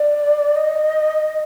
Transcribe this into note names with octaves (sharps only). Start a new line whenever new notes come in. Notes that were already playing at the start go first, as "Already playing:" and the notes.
Already playing: D5
D#5